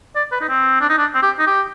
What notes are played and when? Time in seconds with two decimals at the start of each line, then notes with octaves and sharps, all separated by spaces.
0.15 D5
0.32 B4
0.41 D#4
0.49 C4
0.81 D4
0.90 D#4
0.98 D4
1.14 C4
1.22 G4
1.39 D#4
1.47 G4